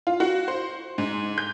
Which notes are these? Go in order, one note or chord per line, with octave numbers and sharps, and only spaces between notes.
F4
F#4
C5
G#2
G6